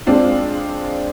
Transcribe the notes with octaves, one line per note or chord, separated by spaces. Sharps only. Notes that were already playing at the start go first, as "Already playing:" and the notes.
G#3 C4 D4 F4